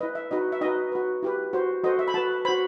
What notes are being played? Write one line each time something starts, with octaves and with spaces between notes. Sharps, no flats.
E4 B4 D#5
E5
D#4 F#4 B4 D#5
E5
D#4 F#4 B4 D#5
F#4 B4
E4 G4 B4
F#4 C5
F#4 A4 C5 D#5
E5
B5
F#4 B4 A5
F#4 C5 B5